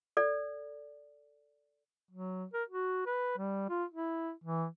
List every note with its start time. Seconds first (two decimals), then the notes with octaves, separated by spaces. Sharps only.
0.17 A4 D5
2.11 F#3
2.54 A#4
2.68 F#4
3.06 B4
3.38 G3
3.70 F4
3.91 E4
4.44 E3